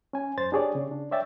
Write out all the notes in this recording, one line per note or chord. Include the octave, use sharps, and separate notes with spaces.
C#4 G#5
F#2 C5 A6
D4 G4 G#4 C#5 D5
C#3
D4
C#5 D5 E5 G5 A6